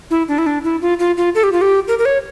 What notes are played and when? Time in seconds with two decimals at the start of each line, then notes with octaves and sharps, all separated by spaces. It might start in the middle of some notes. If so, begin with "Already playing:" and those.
0.11 E4
0.28 D4
0.38 E4
0.46 D4
0.64 E4
0.82 F4
0.99 F4
1.17 F4
1.35 A4
1.43 G4
1.52 F4
1.61 G4
1.88 A#4
1.99 A#4
2.05 C#5